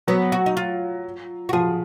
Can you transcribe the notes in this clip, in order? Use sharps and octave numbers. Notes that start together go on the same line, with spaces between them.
F#3 B3
F#4
D#4
F4
F#4
F3 G#4